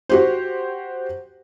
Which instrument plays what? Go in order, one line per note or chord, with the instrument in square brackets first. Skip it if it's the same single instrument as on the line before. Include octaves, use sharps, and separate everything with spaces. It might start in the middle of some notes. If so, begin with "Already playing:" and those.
[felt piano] F#4 G4 C5